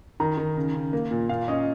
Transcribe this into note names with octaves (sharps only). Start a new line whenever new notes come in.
D#3 A#5
D#3
C#3
C#3
A#3
A#2
A#2 F5
C#4 D#5